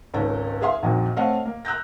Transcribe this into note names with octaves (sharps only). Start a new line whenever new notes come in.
G#1 C#2 G#2 C#4 A4 A#5
G#4 E5 F5 C6
A#1 F2 A#2 D#3 D#4 F#4
A3 C4 C#5 D#5 F5 F#5
A#3
A#5 E6 F#6 G6 A#6